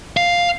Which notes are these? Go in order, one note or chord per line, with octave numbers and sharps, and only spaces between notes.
F5